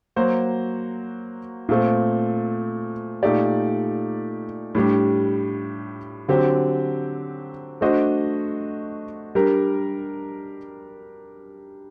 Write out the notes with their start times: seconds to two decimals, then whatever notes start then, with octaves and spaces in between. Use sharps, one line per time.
0.16 F#3 A#3 F#4 C5
1.69 A#2 A3 C4
3.23 A#2 A3 D#4 G4 D5
4.75 A2 G3 D4 G4
6.28 D3 F#3 C4 G4
7.81 A3 D4 F#4 C5 D#5
9.35 G3 D4 G4 A#4